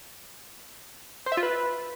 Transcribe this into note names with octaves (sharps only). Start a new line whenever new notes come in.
C5
E5
F4
B4